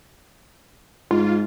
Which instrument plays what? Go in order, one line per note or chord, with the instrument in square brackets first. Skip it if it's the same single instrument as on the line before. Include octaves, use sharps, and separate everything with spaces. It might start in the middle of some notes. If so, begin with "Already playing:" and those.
[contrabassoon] G#2 [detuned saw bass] F4